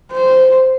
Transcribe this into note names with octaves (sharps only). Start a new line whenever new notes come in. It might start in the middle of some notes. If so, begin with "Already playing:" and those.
C5